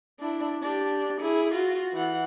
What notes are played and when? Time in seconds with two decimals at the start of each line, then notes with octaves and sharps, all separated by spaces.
0.20 D4 E4
0.62 D4 G4
1.21 E4 G#4
1.54 F4 F#4
1.94 E3 F#5